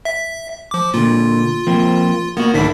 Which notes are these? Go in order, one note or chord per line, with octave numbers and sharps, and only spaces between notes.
E5 B6
F3 D6
A#2 D3 F4
F3 A#3 C4
A#3 B3 F#4
B1 G#2 D#3 D4 E4 B6